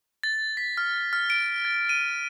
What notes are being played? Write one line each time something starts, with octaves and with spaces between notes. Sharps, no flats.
A6
B6
F6
F6
D7
A6
D#7